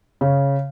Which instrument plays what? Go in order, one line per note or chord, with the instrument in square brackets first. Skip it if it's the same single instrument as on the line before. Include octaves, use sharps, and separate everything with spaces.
[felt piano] C#3